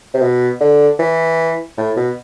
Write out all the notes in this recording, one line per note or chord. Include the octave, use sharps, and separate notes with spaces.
C3
B2
D3
E3
A2
B2